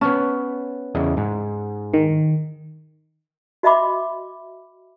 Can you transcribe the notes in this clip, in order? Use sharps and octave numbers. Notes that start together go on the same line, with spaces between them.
B3 C#4 C#5 A5
E2 C#3 D#5
G#2
D#3
F#4 D#5 E5 B5 D6